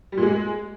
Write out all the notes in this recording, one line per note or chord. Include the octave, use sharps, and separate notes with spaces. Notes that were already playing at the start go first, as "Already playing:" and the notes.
G3
A#2
G#3